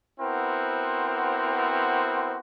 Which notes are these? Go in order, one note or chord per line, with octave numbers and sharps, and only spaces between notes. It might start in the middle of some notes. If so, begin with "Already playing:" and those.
B3 C4 E4 F#4 A#4 C5